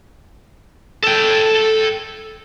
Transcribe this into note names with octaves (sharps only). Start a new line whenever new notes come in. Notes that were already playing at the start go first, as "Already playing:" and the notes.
A4 G5